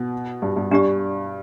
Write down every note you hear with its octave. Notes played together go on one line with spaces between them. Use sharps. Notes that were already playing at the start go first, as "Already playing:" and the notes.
Already playing: B2
G2
G2
G2 D4 G4 D5